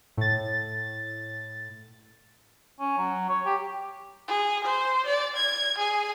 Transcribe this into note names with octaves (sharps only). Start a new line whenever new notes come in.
A2 A6
C#4
F#3
C#5
G4
G#4
C5
D5
G#6
G#4